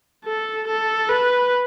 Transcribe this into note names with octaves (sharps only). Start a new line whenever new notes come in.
A4
A4
B4